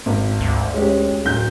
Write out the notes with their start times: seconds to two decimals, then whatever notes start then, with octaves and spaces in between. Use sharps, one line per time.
0.06 G#1
0.40 D2
0.74 G#3 C#4 G4
1.25 D1 G6